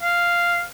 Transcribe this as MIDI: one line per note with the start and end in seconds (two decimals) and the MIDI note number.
0.02 0.63 77